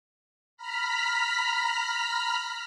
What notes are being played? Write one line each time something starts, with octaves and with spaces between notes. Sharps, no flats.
A#5 B5 F6 B6